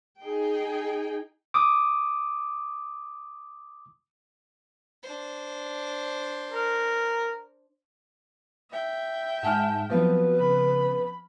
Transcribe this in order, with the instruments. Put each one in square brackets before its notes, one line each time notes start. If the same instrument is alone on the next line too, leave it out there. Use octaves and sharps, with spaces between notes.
[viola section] D#4 G#4 G5
[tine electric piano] D6 D#6
[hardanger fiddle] D4 C5
[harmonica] A#4
[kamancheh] E5 G5
[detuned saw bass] G#2 [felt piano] F#5 G#5 F6 [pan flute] A5
[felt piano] F3 B3 C4 [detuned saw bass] F#3 [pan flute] B4
[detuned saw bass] C#3 [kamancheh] B5